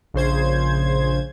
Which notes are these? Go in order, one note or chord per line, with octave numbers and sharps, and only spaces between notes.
A#1 C#3 C5 G#6